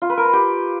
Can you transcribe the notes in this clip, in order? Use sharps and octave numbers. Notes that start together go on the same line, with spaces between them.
F4
B4
A#4
B4
G4